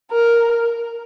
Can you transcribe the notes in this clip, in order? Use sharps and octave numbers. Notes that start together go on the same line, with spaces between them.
A#4